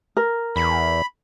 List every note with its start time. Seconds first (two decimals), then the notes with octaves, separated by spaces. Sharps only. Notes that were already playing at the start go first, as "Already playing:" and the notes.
0.17 A#4
0.56 E2 B5